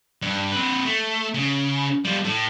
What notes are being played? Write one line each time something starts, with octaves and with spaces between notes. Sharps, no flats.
G2
C4 B4
A3
C#3
G3 F4
A2